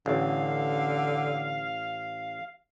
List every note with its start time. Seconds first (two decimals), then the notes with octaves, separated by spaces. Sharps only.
0.06 A1 D3 F5